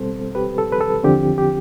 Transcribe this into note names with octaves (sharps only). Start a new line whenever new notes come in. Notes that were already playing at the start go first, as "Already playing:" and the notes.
Already playing: B2 G3 C4 A4 C5
G4 B4
A4
B4
A4
E2 D3 F3 C4 G4
G4